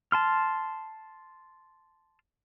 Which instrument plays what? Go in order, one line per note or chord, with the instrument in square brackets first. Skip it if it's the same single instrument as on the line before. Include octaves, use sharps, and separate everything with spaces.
[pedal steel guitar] A5 C6 F6